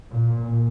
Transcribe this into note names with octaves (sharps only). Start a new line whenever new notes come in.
A#2